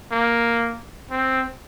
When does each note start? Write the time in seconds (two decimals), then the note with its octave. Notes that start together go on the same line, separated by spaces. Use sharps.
0.12 A#3
1.11 C4